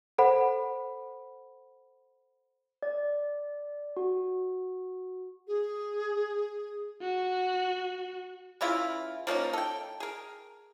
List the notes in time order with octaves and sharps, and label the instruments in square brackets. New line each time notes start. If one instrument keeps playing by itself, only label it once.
[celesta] A4 C5 F#5 B5
[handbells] D5
F#4
[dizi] G#4
[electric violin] F#4
[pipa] C#3 E3 E4 F4
F3 A#3 C#4 D#4
A4 G5
G#4 A#4